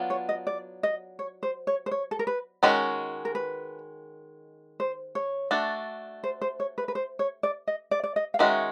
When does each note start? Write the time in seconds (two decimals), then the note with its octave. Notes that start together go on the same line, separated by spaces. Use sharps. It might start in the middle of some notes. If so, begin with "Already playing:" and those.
Already playing: F#3 B3 D4 F4
0.10 C#5
0.29 D#5
0.47 D5
0.83 D#5
1.19 C#5
1.43 C5
1.67 C#5
1.86 C5
1.91 C#5
2.11 A4
2.19 A#4
2.27 B4
2.63 D#3 G#3 C#4 F#4
3.25 A#4
3.35 B4
4.80 C5
5.15 C#5
5.51 A3 D4 F#4
6.24 C5
6.42 C5
6.60 C#5
6.78 B4
6.88 B4
6.95 C5
7.19 C#5
7.43 D5
7.67 D#5
7.91 D5
8.04 D5
8.16 D#5
8.34 F5
8.39 D#3 G#3 C#4 F#4 E5